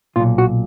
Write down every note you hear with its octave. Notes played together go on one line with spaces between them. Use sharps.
B1 A#2 F4
F#4